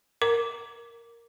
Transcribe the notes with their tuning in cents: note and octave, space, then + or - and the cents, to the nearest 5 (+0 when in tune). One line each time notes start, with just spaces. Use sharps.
A#4 +0 A#5 +0 D6 -10